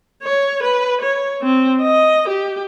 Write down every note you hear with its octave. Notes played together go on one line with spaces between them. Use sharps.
C#5
B4
C#5
C4
D#5
G4